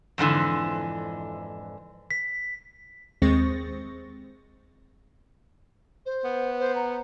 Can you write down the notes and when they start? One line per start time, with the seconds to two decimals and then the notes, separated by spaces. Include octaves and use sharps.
0.18 F2 G#2 D3 E3
2.11 B6
3.22 D#2 G#3 C4 C#6 A6 A#6
6.05 C5
6.25 B3
6.59 C5
6.75 A#5